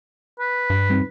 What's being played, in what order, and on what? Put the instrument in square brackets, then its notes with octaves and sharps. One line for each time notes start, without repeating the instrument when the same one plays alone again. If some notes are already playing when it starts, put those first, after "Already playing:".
[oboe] B4
[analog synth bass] G2
[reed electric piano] G3 C4 D#4